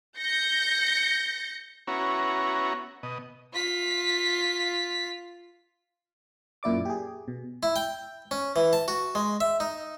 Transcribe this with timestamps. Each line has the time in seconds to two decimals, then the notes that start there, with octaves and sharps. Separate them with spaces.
0.18 G6 A#6 C#7
1.87 B3 C#4 E4 F#4 C#5 A#5
3.03 B2 D#5
3.53 F4 B6
6.63 F#2 A#2 E4 D5 D6
6.85 G4 G#4
7.28 B2
7.63 E4
7.76 G5
8.31 C#4
8.56 E3
8.73 A5
8.88 F#4
9.15 G#3
9.41 E5
9.60 D#4